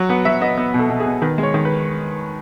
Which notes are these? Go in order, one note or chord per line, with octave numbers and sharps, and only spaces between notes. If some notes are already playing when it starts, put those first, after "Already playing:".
Already playing: F#3
B3 F#5
F#3 E5
B3 D#5
B3
B2
A4
B2
G#4
B2
D#3 B4
G#3
C#5
D#3
B4